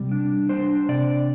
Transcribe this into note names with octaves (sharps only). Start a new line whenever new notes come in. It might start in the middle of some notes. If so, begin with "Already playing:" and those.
Already playing: C3 G3
D4
D4 C5
C3 D5